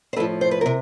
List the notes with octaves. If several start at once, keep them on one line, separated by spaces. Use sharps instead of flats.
C5
A2 F3 A4 B4
C5
B4
C3 A#4